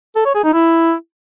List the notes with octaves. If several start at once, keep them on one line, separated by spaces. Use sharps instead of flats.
A4
C#5
G#4
D#4
E4